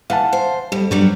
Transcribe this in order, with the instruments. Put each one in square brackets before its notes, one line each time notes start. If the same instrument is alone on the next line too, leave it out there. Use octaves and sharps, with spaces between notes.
[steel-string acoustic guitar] E3 [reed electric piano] F5 F#5 A5
[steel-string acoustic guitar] C5
[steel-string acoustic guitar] F2 [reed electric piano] G3
[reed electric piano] G2 [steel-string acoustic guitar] F#3 G3 D4